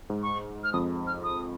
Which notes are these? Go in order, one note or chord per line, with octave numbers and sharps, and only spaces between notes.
G#2
C#6
F6
F2 D#6
F6
D#6